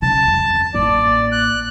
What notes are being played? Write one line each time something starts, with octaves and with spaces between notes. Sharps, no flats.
C#3 A5
F2
A1 A#3 D5
F#6